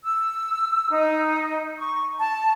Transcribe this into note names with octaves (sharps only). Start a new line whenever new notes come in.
E6
D#4
C#6
A5